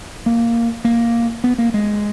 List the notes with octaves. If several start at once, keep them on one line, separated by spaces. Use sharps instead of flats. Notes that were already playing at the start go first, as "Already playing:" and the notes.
A#3
A#3
B3
A#3
G#3